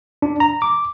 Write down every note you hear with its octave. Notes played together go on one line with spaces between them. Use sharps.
D4
A#5
D6